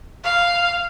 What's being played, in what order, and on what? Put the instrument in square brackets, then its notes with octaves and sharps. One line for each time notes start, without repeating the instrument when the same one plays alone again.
[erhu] F5